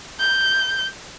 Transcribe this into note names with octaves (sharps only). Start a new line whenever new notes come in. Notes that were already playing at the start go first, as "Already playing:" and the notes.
G6